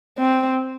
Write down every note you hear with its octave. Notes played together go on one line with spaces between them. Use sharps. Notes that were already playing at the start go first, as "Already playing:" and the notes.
C4